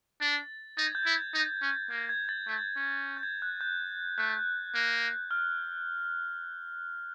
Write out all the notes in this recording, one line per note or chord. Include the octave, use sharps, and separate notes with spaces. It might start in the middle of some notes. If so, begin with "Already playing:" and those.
D4 A6
D#4 A6
G#6
G6
E4 G#6
D#4
C#4
A#3 G#6
G#6
A6
A3 G6
C#4
G6
G#6
F#6
G6
A3 F#6
A#3
F6